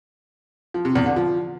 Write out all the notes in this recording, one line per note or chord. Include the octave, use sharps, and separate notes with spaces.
F3
C3
E2
D3
F3